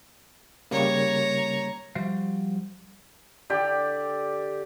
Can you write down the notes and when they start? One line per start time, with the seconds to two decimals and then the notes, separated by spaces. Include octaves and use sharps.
0.71 C#3 G3 A#3 C#5 A#5
1.95 F3 G3 F#4 C5 F5
3.50 D3 G4 D5